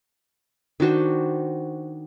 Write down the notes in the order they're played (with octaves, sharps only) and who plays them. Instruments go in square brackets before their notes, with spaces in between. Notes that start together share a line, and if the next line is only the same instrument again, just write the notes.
[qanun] D#3 D4 F#4 C5